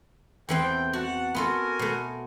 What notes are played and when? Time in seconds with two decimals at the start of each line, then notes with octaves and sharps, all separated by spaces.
0.49 E2 E3 C4 A4 G5
0.93 F#4 F#5 A5
1.35 B3 F4 F#4 A4 A#4 G#5
1.79 B2 A3